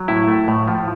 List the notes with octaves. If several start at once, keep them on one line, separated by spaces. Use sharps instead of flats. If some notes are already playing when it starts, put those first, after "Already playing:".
Already playing: F#3
A2 E4
A3
A2
F3